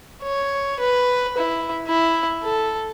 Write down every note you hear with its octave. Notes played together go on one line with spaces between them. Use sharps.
C#5
B4
E4
E4
A4